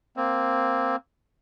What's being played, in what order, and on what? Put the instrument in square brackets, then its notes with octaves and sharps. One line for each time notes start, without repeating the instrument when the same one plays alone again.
[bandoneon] A#3 C4